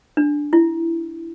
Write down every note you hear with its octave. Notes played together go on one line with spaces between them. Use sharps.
D4
E4